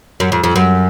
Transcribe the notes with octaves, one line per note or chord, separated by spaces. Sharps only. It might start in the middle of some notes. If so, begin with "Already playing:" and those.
F#2
F2
F2
F#2